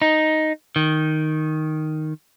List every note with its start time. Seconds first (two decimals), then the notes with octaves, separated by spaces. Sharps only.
0.02 D#4
0.76 D#3